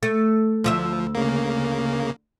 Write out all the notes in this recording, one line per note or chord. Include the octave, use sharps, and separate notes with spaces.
A3
D2 F3 D#4 E5
C#3 A#3